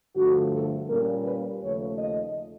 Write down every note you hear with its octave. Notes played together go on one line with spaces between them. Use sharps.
G2 D3 F3 A3 F#4
A4
A#2 G3 A#3 C#4 A#4
B4
D#2 C#3 F3 A3 C#5
D#5